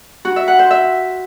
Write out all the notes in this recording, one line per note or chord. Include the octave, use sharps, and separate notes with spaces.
F#4
E5
F#5
C5
E5